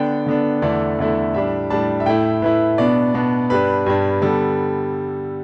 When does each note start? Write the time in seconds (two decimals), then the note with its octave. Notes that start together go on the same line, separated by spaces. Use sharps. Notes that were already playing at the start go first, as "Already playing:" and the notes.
Already playing: D3 B3 D4 G5
0.26 D3 B3 D4
0.62 E2 D3 A3 E4 D5
0.99 E2 D3 A3 E4
1.34 A2 G3 D4 E5
1.70 A2 G3 D4 A5
2.00 E5
2.06 A2 A3 E4 G5
2.42 A2 A3 E4 B4
2.78 B2 B3 D4 D5
3.14 B2 B3 D4
3.50 G2 G3 D4 B4
3.86 G2 G3 D4
4.22 D3 G3 B3 A4